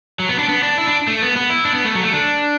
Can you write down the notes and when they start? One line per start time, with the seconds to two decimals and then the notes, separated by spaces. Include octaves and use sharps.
0.19 F#3
0.29 B3
0.39 D4
0.49 B3
0.63 D4
0.78 E4
0.87 D4
1.07 A3
1.22 B3
1.36 B3
1.50 E4
1.65 D4
1.75 B3
1.85 A3
1.95 F#3
2.04 A3
2.13 D4